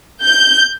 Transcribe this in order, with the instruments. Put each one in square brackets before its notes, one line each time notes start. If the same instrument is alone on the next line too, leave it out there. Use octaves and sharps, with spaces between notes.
[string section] G6